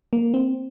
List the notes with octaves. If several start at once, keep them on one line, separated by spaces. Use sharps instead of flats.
A#3
C4